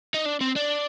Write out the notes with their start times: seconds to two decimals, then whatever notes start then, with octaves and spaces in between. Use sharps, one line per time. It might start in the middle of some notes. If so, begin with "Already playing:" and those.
0.14 D#4
0.26 D4
0.41 C4
0.56 D4